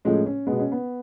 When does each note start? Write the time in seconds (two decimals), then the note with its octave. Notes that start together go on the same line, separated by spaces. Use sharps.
0.05 A2 F3 G#3 C#4
0.26 C#4
0.47 B2 G#3 B3
0.59 C#4
0.72 B3